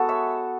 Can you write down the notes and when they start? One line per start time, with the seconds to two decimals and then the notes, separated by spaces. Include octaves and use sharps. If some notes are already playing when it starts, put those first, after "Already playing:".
Already playing: G#3 B3 F#4 A4
0.09 C#5 E5